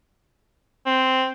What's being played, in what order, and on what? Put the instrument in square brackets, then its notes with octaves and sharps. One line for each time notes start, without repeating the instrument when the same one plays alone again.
[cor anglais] C4